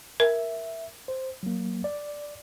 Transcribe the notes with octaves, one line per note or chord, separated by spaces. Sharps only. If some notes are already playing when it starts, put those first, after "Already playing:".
A#4 E5
C5
F#3 A#3
D5